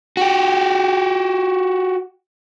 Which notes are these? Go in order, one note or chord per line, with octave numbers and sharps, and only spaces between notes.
F#4 G4